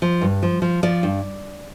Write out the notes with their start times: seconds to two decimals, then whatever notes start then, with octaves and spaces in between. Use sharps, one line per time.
0.02 F3
0.21 G2
0.42 F3
0.62 F3
0.83 F3 D5
1.03 G2